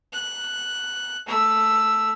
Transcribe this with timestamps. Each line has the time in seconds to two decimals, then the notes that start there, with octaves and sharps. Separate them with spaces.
0.13 F#6
1.27 A3 E6